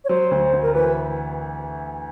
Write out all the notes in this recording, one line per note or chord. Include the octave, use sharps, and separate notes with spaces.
C#5
F#3 C5
D2
D2
A#4
E3 B4